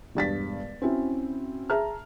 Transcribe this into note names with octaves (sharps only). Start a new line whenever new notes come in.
E1 G2 A6 B6
C4 C#4 E4 F#4
G#4 E5 A5 A#5 F6